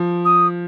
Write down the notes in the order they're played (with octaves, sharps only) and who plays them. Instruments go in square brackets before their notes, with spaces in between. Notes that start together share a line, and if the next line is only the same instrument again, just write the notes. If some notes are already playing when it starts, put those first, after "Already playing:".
Already playing: [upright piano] F3
[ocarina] D#6